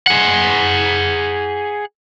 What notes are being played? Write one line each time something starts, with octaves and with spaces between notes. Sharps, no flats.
G#4 F#5